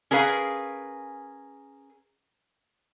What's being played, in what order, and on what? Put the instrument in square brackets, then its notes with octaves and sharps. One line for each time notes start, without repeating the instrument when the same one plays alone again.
[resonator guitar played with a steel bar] C#4 G#4 A#4 B4 F5